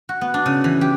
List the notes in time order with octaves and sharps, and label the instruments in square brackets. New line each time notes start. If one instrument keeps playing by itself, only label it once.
[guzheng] F#4
B3
D4
C#3
E3
G4